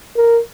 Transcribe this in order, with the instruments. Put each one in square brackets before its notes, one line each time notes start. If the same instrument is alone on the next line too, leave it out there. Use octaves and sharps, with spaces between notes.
[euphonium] A#4